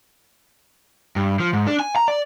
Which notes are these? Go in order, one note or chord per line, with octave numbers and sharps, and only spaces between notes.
G2
F3
G#2
D4
G#5
A#5
D5